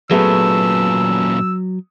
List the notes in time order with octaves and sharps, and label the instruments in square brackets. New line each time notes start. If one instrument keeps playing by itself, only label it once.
[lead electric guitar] A#2 C#4 [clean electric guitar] F#3 [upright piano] A3 B3 G#4 [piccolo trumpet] E6